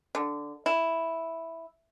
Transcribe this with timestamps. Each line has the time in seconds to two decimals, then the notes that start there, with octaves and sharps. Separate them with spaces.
0.15 D3
0.66 E4